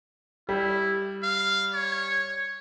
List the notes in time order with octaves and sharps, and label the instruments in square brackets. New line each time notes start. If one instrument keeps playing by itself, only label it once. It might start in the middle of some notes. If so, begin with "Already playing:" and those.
[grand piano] G3 [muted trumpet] E4
[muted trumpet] F5
C#5